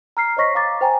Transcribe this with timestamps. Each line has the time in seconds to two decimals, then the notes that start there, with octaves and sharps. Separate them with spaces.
0.17 A#5 F6 C7
0.37 C5 C#5 D#5 C#6 A#6 B6
0.55 F5 A#5 D6 A6
0.81 C5 G5 G#5 A#5